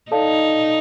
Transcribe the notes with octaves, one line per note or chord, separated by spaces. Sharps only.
D#4 A4 D5 F5 A5